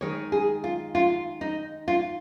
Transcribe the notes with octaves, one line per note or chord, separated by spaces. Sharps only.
D#3 G#3 D#4 C#5
G#4
F4
F4
D#4
F4